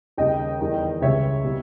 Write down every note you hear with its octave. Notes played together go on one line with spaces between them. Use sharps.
D#2 C#3 G3 D#5 G5
E2 D#3 G3
C#2 C#3 G3 C#5 E5
B2 G3